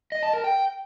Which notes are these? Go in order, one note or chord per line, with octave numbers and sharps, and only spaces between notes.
D#5
A5
A#4
G5